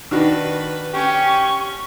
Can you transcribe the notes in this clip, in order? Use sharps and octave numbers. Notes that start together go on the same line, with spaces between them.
D#3 D4 F#4 B4
C#4 G4 C#6